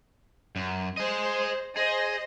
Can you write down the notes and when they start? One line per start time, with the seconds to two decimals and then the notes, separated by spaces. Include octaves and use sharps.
0.56 F#2
0.97 G#4 C5 D#5
1.77 G#4 C5 D#5